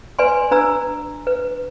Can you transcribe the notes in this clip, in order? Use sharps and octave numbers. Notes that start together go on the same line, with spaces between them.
B4 D5 G#5 C6
D4 B4 A#5 E6
B4